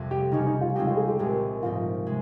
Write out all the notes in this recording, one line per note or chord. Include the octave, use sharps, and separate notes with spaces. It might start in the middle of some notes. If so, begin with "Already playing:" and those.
Already playing: F2 C3 G3
G4
C#3 G3 C#4 D#4
D#4
F4
C#3 G#3 C4 D#4 G4
F4
G#4
G4
C2 A#2 G#3
G#2 F3 A#3 D#4 F4
C3 G#3